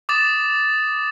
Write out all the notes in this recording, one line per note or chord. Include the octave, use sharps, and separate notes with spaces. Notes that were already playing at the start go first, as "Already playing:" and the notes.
D6 D#6 A6 E7